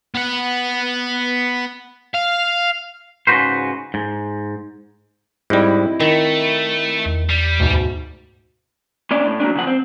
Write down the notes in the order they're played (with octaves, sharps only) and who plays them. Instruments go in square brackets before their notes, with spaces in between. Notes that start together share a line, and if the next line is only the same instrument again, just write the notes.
[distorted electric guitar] B3 F#5
F5
[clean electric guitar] G#2 C#3 G#3 F#4 B4 C5
G#2
[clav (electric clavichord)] G#2 G3 [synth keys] C4 E4 D#5
[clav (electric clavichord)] D#3 [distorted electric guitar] A3
[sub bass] E2
[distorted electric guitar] G3
[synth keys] D2 G#2 B2
[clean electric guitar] A#3 C#4 D4 D5
A2
F#3 A#3 C#4 D4
C#3 F3 F#5
C4